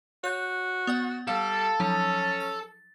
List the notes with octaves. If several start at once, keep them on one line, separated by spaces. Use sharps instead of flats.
F#4 C#5 F#6 G6
B3 D5 F#5
G3 A4 F5
F3 F#3 C#4 D#4
A6